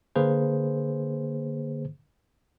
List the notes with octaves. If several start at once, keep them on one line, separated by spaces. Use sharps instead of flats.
D3 A#3 G#4 B4 C5